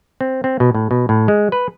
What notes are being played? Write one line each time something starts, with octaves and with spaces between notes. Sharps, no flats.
C4
C4
B2
A2
B2
A2
G#3
B4